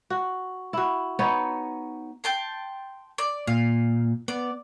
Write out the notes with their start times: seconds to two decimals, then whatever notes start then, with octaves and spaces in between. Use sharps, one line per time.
0.10 F#4
0.73 E4 F#4
1.19 B3 D#4 C#5
2.24 G5 A5 C6
3.18 D5
3.47 A#2 F5
4.28 B3 D5